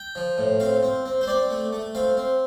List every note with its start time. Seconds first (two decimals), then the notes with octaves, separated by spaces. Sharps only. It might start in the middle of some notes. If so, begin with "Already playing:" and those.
Already playing: G5
0.15 F3
0.38 A2
0.60 C4 F5
0.83 C4
1.06 C4
1.21 C5
1.27 C4 D5
1.51 A3
1.73 A3
1.95 C4 F5
2.17 C4